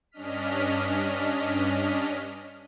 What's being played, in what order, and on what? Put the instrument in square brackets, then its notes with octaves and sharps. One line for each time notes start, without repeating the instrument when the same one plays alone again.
[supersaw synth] G2 C#4 D4 D#5 F6 B6